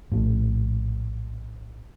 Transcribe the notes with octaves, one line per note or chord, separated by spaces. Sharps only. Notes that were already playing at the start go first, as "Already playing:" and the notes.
A#1 A2 A3